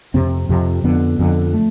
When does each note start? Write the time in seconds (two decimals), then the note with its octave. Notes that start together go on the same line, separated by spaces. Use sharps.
0.14 F2 C3 C4
0.49 F2 C3
0.84 F2 D3 B3
1.19 F2 D3
1.53 A3